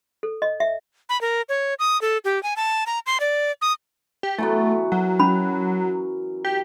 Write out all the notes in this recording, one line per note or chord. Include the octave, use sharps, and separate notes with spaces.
A4
D#5
E5
B5
A#4
C#5
D#6
A4
G4
G#5
A5
A#5
C6
D5
D#6
G4
E3 F#3 A3 B3
F#3 A#4
C#4 B5
G4